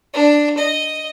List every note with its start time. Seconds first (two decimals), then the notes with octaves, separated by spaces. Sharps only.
0.14 D4
0.58 D#5